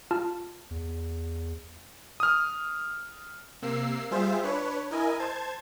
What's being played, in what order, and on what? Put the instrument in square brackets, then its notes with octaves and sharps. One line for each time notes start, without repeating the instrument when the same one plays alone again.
[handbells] F4 A5 F6
[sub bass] E2
[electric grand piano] D#6 F6
[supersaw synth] C3 A#3 E6 C7
G3 F4 G#4 C5 E5
D4 B4 C#5
E4 A#4 D#5 G#5
C5 A5 G#6